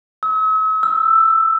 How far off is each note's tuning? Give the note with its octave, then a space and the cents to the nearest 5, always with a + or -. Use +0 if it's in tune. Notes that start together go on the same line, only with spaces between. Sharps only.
E6 -45
E6 +10